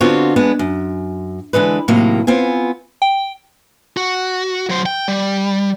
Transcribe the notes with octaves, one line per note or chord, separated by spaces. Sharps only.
D3 B3 C4 F4 F#4 C#5
G#3 B3 D4
F#2
D3 E3 G#3 B4
A2 C3 D#3 F#3 A#3
B3 C4 F4 G#5
G5
F#4
F#3 C5
G5
G3